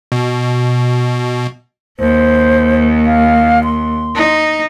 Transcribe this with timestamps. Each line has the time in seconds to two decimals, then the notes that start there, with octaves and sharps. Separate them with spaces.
0.12 B2
1.99 D#2 C5
3.06 F5
3.64 C6
4.15 D#4